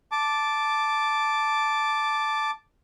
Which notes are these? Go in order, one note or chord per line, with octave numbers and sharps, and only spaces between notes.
A5 D6